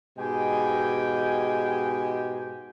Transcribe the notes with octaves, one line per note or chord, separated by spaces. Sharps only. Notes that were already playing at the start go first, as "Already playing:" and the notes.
G#2 B2 G#3 G4 G5 G#5